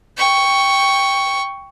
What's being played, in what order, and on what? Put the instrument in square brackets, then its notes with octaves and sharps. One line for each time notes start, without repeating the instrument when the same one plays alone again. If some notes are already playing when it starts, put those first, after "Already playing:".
[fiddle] G5 C#6